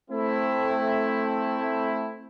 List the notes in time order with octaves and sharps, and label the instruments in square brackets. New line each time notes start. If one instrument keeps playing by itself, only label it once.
[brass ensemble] A3 C4 E4